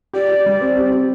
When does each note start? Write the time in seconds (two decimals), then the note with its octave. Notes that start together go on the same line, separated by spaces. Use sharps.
0.13 G4 D5
0.29 G4
0.46 G3
0.61 C4
0.77 G4
0.92 G4